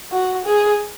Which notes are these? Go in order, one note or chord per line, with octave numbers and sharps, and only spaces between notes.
F#4
G#4